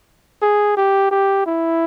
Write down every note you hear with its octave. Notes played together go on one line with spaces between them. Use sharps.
G#4
G4
G4
E4